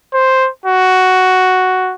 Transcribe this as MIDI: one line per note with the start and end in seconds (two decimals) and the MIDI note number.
0.14 0.50 72
0.66 1.95 66